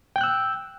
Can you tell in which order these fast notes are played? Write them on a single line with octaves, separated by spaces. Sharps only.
G5 G6 F#6 E6